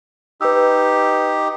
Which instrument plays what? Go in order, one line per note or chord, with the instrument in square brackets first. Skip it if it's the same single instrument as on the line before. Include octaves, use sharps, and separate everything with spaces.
[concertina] D#4 G4 [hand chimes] B4 E6